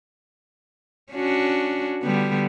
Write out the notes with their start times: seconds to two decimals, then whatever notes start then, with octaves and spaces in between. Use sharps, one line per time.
1.13 C#4 D4 F#4
2.03 D3 G3 B3